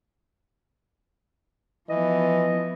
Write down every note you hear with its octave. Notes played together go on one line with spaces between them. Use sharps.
E3 F3 B3 D#5